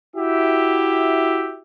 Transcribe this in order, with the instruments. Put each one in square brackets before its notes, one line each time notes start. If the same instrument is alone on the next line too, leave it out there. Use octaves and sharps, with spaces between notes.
[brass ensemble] E4 F#4 G4 E5